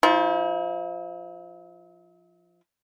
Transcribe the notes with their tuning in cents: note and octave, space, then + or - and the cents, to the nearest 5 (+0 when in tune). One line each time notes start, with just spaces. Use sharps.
F3 +0 E4 -45